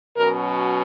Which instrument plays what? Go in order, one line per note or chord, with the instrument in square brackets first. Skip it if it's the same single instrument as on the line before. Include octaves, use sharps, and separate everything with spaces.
[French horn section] B2 F#3 C#4 A#4